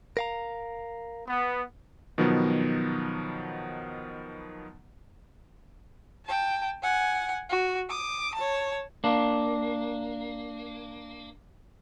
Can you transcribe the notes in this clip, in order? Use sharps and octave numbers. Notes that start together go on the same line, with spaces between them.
A#4 F5 A#5
B3
B2 D#3 F3 F#3 B3
G5 A5
F#5 G#5
F#4
D6 D#6
C#5 A5
A#3 D4